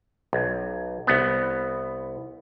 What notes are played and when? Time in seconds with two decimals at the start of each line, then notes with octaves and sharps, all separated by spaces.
0.33 B1
1.07 C2 B3